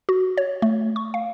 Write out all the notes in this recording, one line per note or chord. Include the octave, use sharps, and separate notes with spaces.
F#4
C#5
A3
C#6
F5